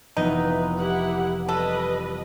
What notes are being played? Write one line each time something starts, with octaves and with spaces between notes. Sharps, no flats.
F1 E3 B3 D#4 B4
E4 G4 F#5
G3 A4 B4 D#5